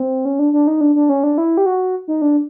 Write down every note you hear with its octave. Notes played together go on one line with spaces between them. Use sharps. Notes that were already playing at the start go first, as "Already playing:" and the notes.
Already playing: C4
C#4
D4
D4
D#4
D4
D4
C#4
D4
E4
G4
F#4
D#4
D4